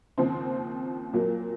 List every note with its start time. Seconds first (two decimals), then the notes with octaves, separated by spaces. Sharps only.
0.18 D#2 C#3 F3 C4 C5
1.13 A#2 F#3 A#3